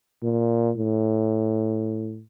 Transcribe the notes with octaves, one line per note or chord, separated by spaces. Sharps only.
A#2
A2